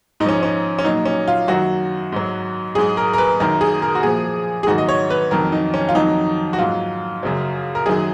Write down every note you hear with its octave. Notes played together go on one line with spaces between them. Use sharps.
G#2 F3 C#4 D#4
C#4
C#4
A#2 F#3 D#4
C#4
F4
F#2 D#3 F#3 F#4
G#2 F#3
G#2 F#3 G#4
A#4
A#4
B4
F#2 D#3 F#3 A#4
G#4
A#4
F#4
A#2 F3 G#4
G#4
G#2 D#3 F#3 F#4
D#5
C#5
B4
F2 D#3 F#3 A#4
D#4
C#4
F4
F2 D#3 F#3 D#4
F#4
G#2 F#3 F4
F#2 C#3 F#3
A#4
F#2 D#3 F#3 G#4